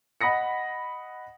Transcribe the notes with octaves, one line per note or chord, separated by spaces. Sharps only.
D#5 F#5 B5 D#6 A#6 C#7